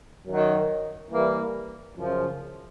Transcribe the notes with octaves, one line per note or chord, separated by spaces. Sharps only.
F#2 D#3 F#3
E3 G3 A#3
F#2 C#3 F3